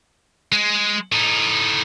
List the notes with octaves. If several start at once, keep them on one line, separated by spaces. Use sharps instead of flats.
G#3
A2 D#4